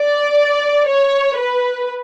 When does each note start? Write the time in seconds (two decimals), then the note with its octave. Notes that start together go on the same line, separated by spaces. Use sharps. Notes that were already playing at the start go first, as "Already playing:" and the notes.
Already playing: D5
0.88 C#5
1.37 B4